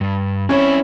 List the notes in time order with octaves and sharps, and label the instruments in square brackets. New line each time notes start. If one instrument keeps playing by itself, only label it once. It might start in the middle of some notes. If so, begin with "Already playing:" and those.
[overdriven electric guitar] G2
[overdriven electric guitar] C4 E4 [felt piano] C#4 C#5